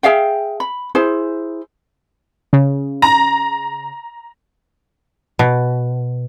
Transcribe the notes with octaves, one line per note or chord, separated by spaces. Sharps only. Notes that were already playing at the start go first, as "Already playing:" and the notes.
G#4 E5 F5 G5
B5
E4 G#4 C5
C#3
A#5
B2